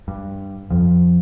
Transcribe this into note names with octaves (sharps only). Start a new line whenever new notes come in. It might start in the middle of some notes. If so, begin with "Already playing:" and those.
G2
F2 F3